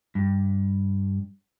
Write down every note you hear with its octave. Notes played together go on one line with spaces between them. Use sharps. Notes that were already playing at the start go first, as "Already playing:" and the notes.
G2